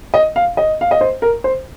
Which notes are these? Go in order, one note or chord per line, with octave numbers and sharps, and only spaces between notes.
D#5
F5
D#5
F5
D#5
C5
A#4
C5